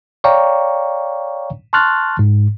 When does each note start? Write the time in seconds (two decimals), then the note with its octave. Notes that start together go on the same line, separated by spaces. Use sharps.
0.24 C#5 D5 F5 G5 A#5 C#6
1.73 A5 C6 C#6 F6 F#6 A6
2.19 G#2